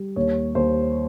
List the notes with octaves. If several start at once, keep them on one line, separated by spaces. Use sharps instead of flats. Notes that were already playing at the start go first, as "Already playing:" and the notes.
Already playing: G3
D#2 C#5
D#2 C5